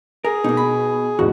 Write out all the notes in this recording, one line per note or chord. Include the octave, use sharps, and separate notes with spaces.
G#4 A#4
B2 A#3 D#4
B5
E2 G#2 B2 F#4